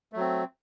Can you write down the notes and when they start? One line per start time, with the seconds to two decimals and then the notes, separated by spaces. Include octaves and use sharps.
0.13 A3
0.16 F#3
0.20 C4